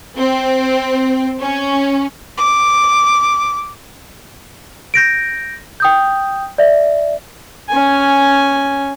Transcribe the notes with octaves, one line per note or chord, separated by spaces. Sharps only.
C4
C#4
D6
G6 A#6 D7
G5 D#6 G6
D5 E5
C#4 G#5